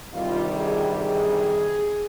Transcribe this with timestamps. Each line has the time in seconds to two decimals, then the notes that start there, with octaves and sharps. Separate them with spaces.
0.12 D2 C3 D#3 G3 F4
0.54 G#4
0.95 G#4